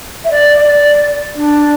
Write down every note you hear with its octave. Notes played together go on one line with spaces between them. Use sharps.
E5
D5
D5
D4